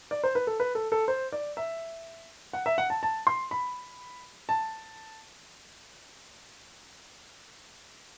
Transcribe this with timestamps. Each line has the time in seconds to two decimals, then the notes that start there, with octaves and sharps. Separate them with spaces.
0.11 D5
0.24 C5
0.35 B4
0.47 A4
0.60 B4
0.75 A4
0.92 A4
1.08 C5
1.32 D5
1.57 E5
2.53 F#5
2.66 E5
2.78 F#5
2.90 A5
3.03 A5
3.27 C6
3.51 B5
4.49 A5